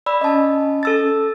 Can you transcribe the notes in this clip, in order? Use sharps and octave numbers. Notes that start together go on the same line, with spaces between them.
D5 B5 E6
C#4 D#5 A5
A4 E6 A6